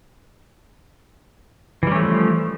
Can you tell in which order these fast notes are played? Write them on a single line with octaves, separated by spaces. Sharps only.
E3 G3 C#4 A3 F3